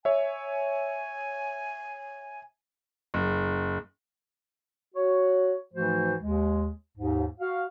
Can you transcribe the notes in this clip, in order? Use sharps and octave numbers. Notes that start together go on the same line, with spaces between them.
C#5 E5 G#5
F#1
F#4 C#5
G#2 E3 F3 A3 F#4 C5
D#2 G#3
D#2 G#2
F#4 F5